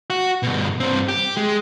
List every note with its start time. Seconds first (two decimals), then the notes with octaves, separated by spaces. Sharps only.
0.10 F#4
0.43 G2 B2
0.80 G2 C4
1.08 G4
1.37 G#3